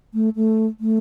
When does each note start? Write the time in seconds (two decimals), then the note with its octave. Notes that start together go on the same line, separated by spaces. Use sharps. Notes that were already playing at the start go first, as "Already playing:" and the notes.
0.14 A3
0.36 A3
0.80 A3